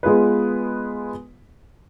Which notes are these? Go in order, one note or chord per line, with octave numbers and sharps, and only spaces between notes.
G#3 B3 F4 G#4 B4